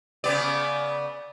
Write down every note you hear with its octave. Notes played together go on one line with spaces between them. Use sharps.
C#3 B3 D5